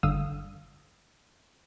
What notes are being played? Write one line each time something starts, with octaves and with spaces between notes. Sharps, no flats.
G1 D3 F5 D#6 E6